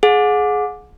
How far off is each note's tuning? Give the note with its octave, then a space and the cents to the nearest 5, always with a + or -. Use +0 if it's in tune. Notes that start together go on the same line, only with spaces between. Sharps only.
G#4 +20 F#5 -35